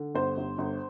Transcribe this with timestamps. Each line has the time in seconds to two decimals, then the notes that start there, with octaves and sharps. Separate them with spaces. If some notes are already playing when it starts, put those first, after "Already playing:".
Already playing: D3
0.15 G1 C5
0.37 G1
0.58 G1